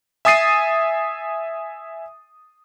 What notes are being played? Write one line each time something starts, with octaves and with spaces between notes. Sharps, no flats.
E5 G#5 D#6 A6 C7 D#7